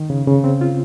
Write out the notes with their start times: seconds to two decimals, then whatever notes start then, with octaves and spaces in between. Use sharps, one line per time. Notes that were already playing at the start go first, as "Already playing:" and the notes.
Already playing: D#3
0.10 C#3
0.27 C#3
0.44 C4
0.61 F4